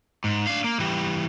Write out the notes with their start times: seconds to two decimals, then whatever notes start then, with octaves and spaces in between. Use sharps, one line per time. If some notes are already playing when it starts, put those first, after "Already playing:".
0.24 G#2
0.47 D4 F5
0.64 A#3
0.80 E3 G3